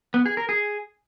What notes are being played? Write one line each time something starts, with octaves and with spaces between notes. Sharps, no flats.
B3
G#4
A#4
G#4